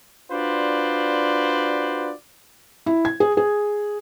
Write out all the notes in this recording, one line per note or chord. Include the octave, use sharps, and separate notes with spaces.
D4 F4 F#4 B4 C5 D5
E4
G#6
G#4
G#4